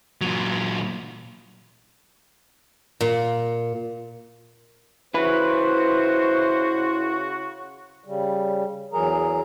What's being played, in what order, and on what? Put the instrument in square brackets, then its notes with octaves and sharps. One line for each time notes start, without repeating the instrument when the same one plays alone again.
[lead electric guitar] A#2 F#3
[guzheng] A#2
[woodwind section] C#3 F#4 [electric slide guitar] E4 B4 [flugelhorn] C5
[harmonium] C#3 G3
E2 E3 F#3 G#4 A#4 A#5